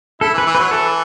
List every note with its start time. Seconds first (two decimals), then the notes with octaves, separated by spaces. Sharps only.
0.21 E4 A4
0.34 E3
0.38 B4
0.46 E3
0.55 B4
0.59 F#3
0.71 E3 A4